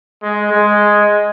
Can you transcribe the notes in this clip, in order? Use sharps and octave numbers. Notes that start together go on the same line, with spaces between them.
G#3
G#3